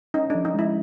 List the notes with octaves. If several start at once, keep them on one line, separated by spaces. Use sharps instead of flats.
C#4 D#4
D4
F3
D#4
G#3 E4